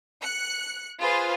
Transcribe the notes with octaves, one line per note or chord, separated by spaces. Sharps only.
F#6 C#7
F4 G#4 B4 C5 F5